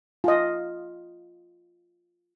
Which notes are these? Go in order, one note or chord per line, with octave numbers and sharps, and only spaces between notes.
F4 D#5